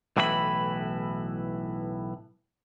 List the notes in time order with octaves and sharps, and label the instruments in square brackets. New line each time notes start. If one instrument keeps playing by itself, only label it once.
[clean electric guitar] B1 A2 E3 E4 F#4 B5